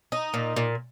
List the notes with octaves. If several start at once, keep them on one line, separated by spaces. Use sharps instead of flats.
D#4
A#2
A#2